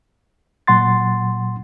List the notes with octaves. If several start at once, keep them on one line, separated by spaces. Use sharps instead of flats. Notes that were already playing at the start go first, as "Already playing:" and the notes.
A#2 F#3 F#5 C6 A6